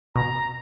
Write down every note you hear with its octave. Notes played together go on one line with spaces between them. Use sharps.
B2 A#5